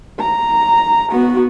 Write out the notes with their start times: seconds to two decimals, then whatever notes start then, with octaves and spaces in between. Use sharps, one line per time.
0.20 A#5
1.10 B3 F#4